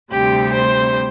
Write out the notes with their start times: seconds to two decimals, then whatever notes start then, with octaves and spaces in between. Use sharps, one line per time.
0.12 D2 C3 G3 C4 G4
0.53 C5